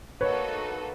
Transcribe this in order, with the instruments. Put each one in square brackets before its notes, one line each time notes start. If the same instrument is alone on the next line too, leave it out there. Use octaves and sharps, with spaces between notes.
[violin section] A#3 D#4 F#4 A4 [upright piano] B4 C#5